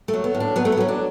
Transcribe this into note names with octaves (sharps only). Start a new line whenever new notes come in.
A3
F#3
B3
A2
D4
F#3 B3
A3
B3
F#3 C#4
D4